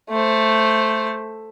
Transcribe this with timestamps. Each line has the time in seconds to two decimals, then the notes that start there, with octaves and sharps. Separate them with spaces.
0.10 A3 C5